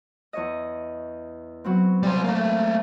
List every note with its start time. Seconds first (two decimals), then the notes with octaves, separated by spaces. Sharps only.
0.33 E2 C#5 D#5
1.64 F#3 B3 C4
2.03 G3 C5
2.24 A3 A#3